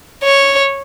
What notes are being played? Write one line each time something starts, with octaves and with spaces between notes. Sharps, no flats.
C#5